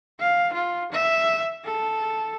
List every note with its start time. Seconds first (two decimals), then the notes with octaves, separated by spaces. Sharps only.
0.19 F5
0.53 F4
0.92 E5
1.65 A4